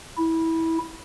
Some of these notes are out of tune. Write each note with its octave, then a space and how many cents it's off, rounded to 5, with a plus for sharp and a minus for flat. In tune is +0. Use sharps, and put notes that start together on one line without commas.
E4 -15